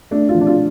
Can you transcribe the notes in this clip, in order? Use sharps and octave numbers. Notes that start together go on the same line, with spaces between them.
A3 D4
F4
F3
D4
F4